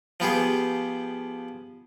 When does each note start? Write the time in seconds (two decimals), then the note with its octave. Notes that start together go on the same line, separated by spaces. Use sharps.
0.20 F3 B3 G4 G#4